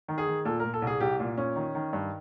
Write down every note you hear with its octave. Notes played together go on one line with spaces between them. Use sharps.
D#3
G#4
D#3
A#2 A4
A#2 A#4
A4
C2
G#4
C2 G4
A#2
A#2 C#4
D#3
D#3
G2